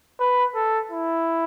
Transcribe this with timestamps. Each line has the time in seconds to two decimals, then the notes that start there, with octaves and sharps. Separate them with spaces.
0.20 B4
0.55 A4
0.91 E4